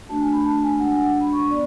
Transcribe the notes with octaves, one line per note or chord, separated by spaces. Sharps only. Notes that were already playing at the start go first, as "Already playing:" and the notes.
A3 D4 F#4 A5
G#5
B5
A5
G#5
G#3 D4 F#4 F#5
G#5
F#5
B5
C#6
B3 D5